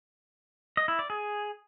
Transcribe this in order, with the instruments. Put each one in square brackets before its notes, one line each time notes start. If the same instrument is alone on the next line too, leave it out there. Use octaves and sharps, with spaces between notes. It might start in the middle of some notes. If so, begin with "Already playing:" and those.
[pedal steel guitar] D#5
E4
D5
G#4